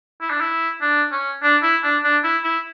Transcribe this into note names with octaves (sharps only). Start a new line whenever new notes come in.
E4
D4
E4
D4
C#4
D4
E4
D4
D4
E4
E4